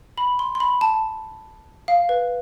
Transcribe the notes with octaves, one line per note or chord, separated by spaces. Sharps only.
B5
C6
C6
B5
A5
F5
B4